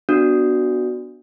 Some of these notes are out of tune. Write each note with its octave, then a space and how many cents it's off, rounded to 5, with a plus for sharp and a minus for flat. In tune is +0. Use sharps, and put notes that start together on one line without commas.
B3 +0 D4 +10 F#4 +0